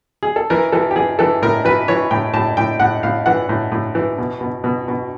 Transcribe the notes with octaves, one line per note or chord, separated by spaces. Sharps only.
G#4
A4
E3 A#4
E3 A4
G4
E3 G#4
E3 A4
A2 A#4
E3 B4
E3 C#5
A2 G5
A2 A5
A2 G5
A2 F#5
A2 F5
E3 F#5
A2
A2
E3
B2
B2
B2
B2